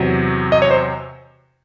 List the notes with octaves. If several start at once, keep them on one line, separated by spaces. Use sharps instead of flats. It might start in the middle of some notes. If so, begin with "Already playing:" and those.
Already playing: E2 C3 F#3
D#5
C#5
C5